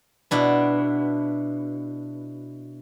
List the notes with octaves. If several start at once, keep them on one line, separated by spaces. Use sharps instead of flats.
B2 D4 E4